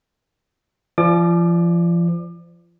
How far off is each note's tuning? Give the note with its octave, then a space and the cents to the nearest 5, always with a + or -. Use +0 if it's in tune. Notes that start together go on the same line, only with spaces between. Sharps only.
F3 -35 D5 +0 D6 +35